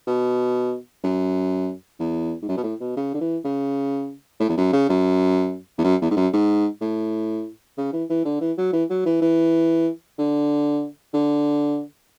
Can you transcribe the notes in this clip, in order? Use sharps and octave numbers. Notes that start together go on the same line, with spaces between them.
B2
F#2
E2
G#2
F#2
B2
A2
B2
C#3
D3
E3
C#3
A2
E2
F#2
C#3
F#2
E2
F#2
E2
G#2
F#2
G#2
A2
C#3
E3
E3
D3
E3
F#3
E3
F#3
E3
E3
D3
D3